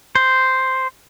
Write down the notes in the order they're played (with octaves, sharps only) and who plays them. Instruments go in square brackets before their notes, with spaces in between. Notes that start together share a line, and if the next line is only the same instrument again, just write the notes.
[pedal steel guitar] C5